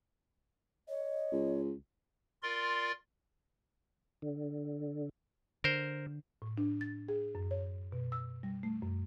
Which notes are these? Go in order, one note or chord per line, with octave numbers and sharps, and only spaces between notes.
C#5 D#5
C#2
F4 A#4 D5 C6
D3
D3 A#4 C5
A2
D4
A6
G#4
F#2
C#5
B2
E6
G3
A3
F#2